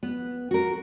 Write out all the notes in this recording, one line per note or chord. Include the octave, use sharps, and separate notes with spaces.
B3
F#4 A#4